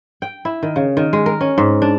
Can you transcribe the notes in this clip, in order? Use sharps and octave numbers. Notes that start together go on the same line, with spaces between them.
G5
E4
D#3
C#3
D#3
G#3
A#4
C#4
G#2
D4